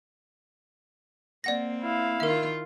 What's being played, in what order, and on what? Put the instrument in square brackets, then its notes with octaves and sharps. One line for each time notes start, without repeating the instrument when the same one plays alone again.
[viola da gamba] A#3 C4 [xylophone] D5 F#5 A#6
[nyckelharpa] E4 F5
[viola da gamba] D#3 F4 [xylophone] A#4 E5